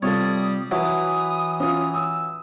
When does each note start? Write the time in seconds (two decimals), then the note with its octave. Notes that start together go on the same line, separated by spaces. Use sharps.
0.02 C3 G3 F4 A4 C#5 D#6
0.71 E3 F#3 E4 B4 D#6
1.60 C#4 F4 D#6
1.94 D#6 E6